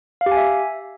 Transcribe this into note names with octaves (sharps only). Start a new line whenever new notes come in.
F5
G4
G#5
E5